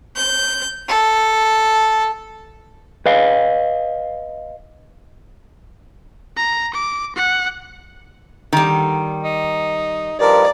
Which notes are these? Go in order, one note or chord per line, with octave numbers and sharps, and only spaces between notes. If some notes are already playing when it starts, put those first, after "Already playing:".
G6
A4
B4 D#5 F5
A#5
D6
F#5
D3 D#3 G3
D#4
G2 F3 D#4 A#4 D5